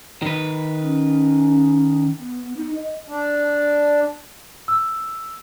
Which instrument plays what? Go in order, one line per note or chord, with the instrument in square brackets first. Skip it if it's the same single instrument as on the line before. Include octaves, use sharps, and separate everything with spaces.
[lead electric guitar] D#3 B4
[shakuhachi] C#4
B3
D#4
D#5
[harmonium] D4
[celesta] E6